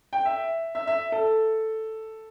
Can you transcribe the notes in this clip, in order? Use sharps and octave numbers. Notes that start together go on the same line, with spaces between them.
G5
E5
E5
E5
A4